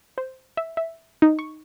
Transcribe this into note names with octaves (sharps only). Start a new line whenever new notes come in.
C5
E5
E5
D#4
C#6